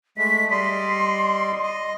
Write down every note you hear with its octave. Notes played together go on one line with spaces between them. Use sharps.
G#3 A3 B6
G3 D5 D#5 C6
D#5